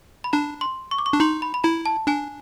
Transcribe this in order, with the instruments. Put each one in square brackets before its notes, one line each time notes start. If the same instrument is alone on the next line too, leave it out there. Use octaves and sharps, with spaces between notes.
[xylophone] B5
[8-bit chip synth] D4 [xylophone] A#5
[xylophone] C6
C#6
D6
C#6
[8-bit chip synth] D4
[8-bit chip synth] D#4 [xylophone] C6
[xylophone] B5
B5
[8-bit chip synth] E4 [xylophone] A#5
[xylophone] A5
[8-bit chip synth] D4 [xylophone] G#5